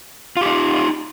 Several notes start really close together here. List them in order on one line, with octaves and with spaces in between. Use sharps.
F4 G4 D#4